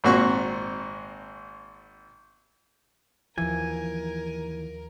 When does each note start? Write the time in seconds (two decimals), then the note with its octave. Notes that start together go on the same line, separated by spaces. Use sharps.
0.04 G#1 A#2 C4 F#4 C#6
3.38 D#2 E3 F3 A#4 G#5